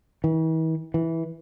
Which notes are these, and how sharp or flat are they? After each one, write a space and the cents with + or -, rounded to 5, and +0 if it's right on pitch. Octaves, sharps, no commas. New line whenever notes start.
E3 -45
E3 -10